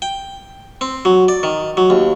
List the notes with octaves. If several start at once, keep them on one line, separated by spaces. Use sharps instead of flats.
G5
C4
F#3
D5
D#3
F#3
D#2